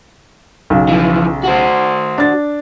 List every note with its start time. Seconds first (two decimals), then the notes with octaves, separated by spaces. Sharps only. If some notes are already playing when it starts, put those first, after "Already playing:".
0.70 B1 C#3
0.89 E3 F3
1.43 F#4 C5
2.18 D4 A6